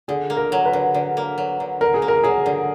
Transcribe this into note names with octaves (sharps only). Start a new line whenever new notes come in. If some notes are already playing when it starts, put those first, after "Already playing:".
D3 G#4
A#3
A#4
F#3
B4
D3
D3
A#3
F#3
D3
D3 A#4
G#4
A#3
A#4
F#3 G#4
D3